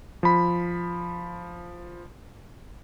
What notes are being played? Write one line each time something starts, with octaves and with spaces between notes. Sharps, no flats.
F3 B5